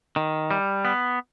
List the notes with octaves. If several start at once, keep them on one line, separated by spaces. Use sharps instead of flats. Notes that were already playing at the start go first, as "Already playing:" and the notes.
D#3
G3
B3